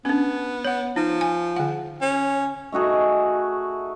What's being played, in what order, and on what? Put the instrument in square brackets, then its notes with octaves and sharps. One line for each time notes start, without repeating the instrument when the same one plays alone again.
[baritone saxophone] B3 [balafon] C#4 D4
[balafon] C#5 F#5
[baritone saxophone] F3 [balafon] D#4
[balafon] G#5
D3 F#5
[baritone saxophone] C#4
[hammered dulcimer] A3 D#4 F#4 G#4